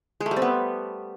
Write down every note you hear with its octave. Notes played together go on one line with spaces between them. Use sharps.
G#3
A3
G3
C4
B3